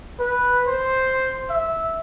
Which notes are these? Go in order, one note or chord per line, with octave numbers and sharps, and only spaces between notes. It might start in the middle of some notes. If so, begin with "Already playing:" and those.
B4
C5
E5